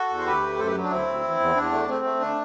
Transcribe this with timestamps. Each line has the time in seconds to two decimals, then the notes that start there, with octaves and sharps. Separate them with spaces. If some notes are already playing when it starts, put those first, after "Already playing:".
Already playing: F#4 A4
0.10 E2
0.18 C5
0.26 D2 G4 B4
0.42 A3
0.58 F#2 A4 C5
0.67 G4 B4
0.75 F#3
0.83 D4
0.91 D2 C4 E4
1.08 D2
1.23 E2
1.40 E2
1.56 E2 D4
1.72 A3
1.88 A3 C4
2.04 A3
2.20 D3 D4